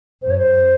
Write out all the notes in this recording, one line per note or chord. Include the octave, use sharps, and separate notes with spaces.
F#2 C5
C#5
C5